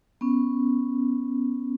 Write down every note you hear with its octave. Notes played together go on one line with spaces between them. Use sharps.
B3 C#4